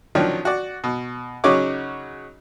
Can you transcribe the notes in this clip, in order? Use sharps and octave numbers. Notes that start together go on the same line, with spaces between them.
D#3 F3 F#3 C#4 D4
F#4 D5
B2
C#3 F#3 C#4 D#4 F#4 D6